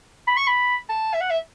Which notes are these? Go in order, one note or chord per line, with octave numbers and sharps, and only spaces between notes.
B5
C#6
B5
A5
E5
F#5
E5